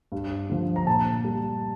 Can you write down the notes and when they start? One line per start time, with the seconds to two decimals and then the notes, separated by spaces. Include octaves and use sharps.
0.12 G2
0.50 D3 F3
0.76 A#5
0.87 A#2 A5
1.24 G3